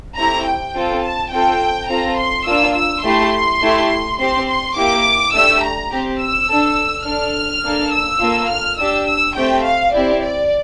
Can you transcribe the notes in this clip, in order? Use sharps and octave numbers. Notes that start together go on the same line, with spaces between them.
A3 C4 E4 G4 A#5
G5
C4 F4 A4
A5
C4 F4 A4 G5
C4 F4 A4 A#5
C6
A#3 D4 F4 E6
E6
A3 E4 G4 C6
A3 E4 G4
C4 G4 C6
C6
A#3 E4 G4 D6
A3 D4 G4 E6
A#5
C4 G4
E6
D4 A4
D4 A4 F6
A#3 D4 A4
E6
A#3 F4 A4
F6
D4 G4 E6
E6
A3 C4 G4 G5
F5
C4 E4 G4 D5
D5